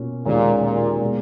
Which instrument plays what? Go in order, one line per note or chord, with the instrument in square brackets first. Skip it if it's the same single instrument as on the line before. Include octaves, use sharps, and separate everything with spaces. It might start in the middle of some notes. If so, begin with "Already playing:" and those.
Already playing: [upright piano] B2 A#3 C#4 F4
[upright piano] D#2 D#3 G#3 C#4 [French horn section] A#2
[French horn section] A#2
[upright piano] B2 G#3